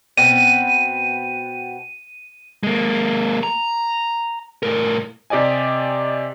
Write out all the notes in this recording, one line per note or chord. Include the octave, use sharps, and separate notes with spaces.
B2 B3 C4 D#7
G#3 A#3
A#5
A2 A#4
C3 G4 D5 D#5 G#5